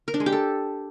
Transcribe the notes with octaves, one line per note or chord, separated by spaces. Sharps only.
A#4
D4
G#3
G4
A4